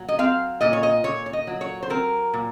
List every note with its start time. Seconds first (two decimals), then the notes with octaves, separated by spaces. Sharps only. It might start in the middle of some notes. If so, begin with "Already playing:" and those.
Already playing: A#2 F#3
0.09 D#5
0.19 C4 F5
0.61 A#2 D#5
0.73 C#5
0.83 D#5
1.04 A#2 C#5
1.26 C#5
1.33 D#5
1.47 F#3
1.61 C#5
1.83 C5
1.90 C4 A#4
2.33 A#2